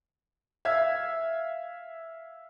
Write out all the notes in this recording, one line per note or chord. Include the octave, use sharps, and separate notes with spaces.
E5 F5 G#6